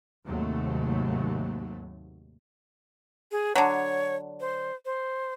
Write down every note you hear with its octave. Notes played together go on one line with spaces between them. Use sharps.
D#2 G#2 C3 F#3 A3
G#4
D3 F#3 C#5
C5
C5